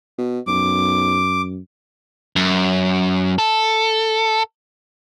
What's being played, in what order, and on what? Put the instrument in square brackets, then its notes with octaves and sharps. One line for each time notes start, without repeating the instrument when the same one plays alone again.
[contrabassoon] B2
[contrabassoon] B1 [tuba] F#2 [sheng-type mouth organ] D6
[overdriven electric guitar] F#2
A4